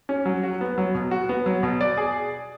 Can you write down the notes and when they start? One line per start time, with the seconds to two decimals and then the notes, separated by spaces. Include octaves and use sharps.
0.09 C#4
0.26 F#3
0.43 F#4
0.61 B3
0.78 F#3
0.95 B2
1.11 F#4
1.29 B3
1.46 F#3
1.63 B2
1.81 D5
1.97 G#4